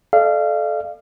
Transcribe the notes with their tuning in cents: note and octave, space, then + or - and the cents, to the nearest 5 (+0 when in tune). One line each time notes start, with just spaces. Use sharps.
A4 -25 D5 +40 F5 -25